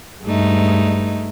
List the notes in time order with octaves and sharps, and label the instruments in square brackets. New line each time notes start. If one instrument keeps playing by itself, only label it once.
[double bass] G2 [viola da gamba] G#3 A3 D#4